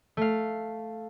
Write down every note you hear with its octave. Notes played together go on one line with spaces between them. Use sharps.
A3 F5